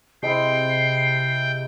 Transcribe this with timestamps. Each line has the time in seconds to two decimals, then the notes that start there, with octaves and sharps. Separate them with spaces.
0.23 C3 G#3 E4 G5 C7